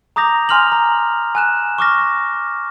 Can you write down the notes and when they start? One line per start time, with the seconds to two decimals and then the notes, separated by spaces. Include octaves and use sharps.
0.16 A#5 D6 D#6 G6 A#6 F7
0.49 G#5 C6 F6 F7 F#7
0.72 A#5
1.35 G#5 F#6 E7
1.78 C#6 D6 F6 A#6